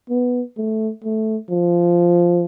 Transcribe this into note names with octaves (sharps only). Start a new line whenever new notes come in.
B3
A3
A3
F3